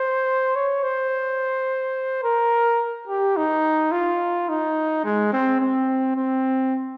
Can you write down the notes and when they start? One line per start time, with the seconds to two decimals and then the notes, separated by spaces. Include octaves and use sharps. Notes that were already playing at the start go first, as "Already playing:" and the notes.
Already playing: C5
0.55 C#5
0.83 C5
2.23 A#4
3.08 G4
3.37 D#4
3.92 F4
4.49 D#4
5.04 G#3
5.33 C4
5.60 C4
6.16 C4